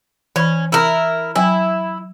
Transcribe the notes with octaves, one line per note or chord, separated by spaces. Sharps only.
E3 C#4 B5
E4 A#4
F#3 E4 G5 G#5